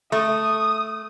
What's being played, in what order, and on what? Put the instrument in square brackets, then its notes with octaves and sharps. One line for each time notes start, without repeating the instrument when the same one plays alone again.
[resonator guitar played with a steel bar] A3 [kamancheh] D#6